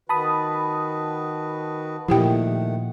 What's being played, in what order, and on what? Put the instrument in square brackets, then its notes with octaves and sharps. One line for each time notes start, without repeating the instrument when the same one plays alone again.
[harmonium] D#3 F#4 B4 [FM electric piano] A5 B5 D#6
[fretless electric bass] A#2 F3 [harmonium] D#3 A3 F#5 [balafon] E4 G4 G5